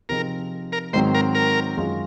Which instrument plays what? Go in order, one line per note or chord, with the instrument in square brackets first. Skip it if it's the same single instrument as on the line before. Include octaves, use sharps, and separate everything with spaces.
[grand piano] C3 F3 C4 D#4 G#4 [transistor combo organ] A#4
[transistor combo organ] A#4
[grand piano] G#2 D#3 F#3 C4 [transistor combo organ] C5
[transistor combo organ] A#4
A#4
[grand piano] F#2 D#3 G#3 C#4 F4